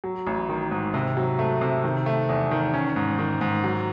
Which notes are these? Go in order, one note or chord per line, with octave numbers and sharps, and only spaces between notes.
F#3
A1
D#3
G#2
C3
F#3
A3
C3
D#3
A3
E2
D#3
C#4
G#2
D#3
G#2
F#3